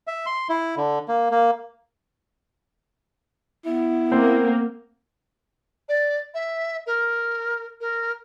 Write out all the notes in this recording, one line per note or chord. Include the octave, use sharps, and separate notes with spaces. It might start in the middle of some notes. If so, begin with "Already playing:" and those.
E5
C6
E4
D3
A#3
A#3
B3 E4
A#3 C4
D5
E5
A#4
A#4